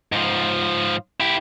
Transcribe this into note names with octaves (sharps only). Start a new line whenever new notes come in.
G#2 F3
E4 G4